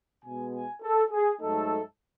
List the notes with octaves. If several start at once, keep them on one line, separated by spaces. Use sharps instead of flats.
B2 G#3 B3 G#5
G#5
A4
G#4
G#2 F#3 A3 D#4 A4